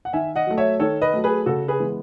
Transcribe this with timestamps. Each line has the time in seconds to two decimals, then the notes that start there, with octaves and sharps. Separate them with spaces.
0.05 F#5
0.13 D#3 E5 G#5
0.36 D#5 F#5
0.47 F#3 A3
0.58 C#5 E5
0.80 D#3 A4 C#5
1.02 B4 D#5
1.13 F#3 A3
1.24 G#4 B4
1.46 C#3 F#4 A4
1.68 G#4 B4
1.79 E3 G#3 B3